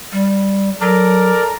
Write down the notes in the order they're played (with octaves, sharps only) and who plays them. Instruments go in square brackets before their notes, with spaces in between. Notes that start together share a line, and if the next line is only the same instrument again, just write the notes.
[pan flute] G3
[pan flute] F#3 [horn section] A4 A#5 [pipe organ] A#4 D5